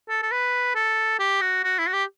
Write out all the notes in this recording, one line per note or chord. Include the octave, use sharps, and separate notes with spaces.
A4
A4
B4
A4
G4
F#4
F#4
E4
F#4
G4